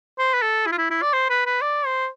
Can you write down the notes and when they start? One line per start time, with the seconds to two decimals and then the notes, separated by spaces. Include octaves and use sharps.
0.18 C5
0.34 B4
0.42 A4
0.66 E4
0.72 F4
0.78 E4
0.90 E4
1.02 D5
1.13 C5
1.29 B4
1.46 B4
1.61 D5
1.86 C5